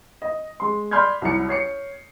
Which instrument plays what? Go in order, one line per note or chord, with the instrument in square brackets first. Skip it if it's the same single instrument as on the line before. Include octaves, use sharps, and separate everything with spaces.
[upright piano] D#5
G#3 C6
D5 B5 C6 F6 G6 G#6
C2 F#3 E4 C#7
C#5 C7 C#7